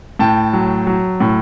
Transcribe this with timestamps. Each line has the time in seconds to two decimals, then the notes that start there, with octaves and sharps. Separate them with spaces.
0.19 A2 G5 A5
0.53 F#3
0.87 F#3
1.20 A2